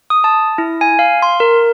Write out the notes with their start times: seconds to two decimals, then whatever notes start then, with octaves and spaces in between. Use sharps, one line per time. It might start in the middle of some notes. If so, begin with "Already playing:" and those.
0.10 D#6
0.24 A5
0.58 E4
0.81 G#5
0.99 F5
1.22 C6
1.40 A#4